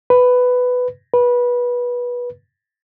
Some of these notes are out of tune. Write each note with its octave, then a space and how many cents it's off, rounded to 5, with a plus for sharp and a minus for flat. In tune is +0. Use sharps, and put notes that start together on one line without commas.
B4 +10
B4 -20